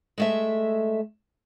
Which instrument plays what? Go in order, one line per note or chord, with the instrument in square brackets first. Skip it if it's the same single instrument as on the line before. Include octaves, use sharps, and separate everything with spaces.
[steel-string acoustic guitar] G#3 A3 E5